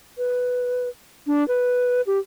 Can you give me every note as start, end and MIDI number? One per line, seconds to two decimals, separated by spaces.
0.18 0.89 71
1.27 1.46 62
1.48 2.01 71
2.07 2.19 67